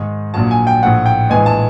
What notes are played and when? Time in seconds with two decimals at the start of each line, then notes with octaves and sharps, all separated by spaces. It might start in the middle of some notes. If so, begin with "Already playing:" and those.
Already playing: G#2 D#3 G#3
0.34 A#1 A#2 F#3 A5
0.51 G#5
0.67 G5
0.83 A#1 A2 F3 F#5
1.06 G5
1.30 A#1 A2 E3 G#3 G#5
1.46 A5